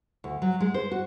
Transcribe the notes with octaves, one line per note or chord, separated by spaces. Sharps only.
D2
F#3
G#3
C5
F#4